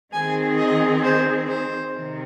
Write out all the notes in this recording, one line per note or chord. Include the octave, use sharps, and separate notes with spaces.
D#3 C4 G#4 G#5
D#5
C5
C5
C3 D#3